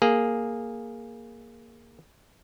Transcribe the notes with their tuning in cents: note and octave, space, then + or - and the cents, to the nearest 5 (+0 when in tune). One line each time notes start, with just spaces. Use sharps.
A#3 +0 G#4 +0